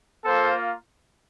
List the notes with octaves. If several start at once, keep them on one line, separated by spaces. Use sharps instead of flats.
A#3 F4 A4 C5